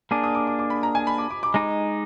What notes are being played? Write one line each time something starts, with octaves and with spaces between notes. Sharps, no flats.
A#3 D4 G#4 D6
D#6
D6
D6
D6
B5
A#5
G#5
B5
D6
D6
D6
G#3 D#4 D6